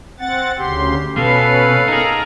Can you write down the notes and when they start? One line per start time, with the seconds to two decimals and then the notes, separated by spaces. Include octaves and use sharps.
0.19 C4 F#5 A6
0.59 D2 C#3 G4 C6
1.17 B2 C#4 A4 B4 F5
1.88 D#4 G#4 A#4 A#5